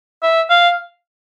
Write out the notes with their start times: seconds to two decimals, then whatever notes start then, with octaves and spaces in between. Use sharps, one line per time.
0.23 E5
0.50 F5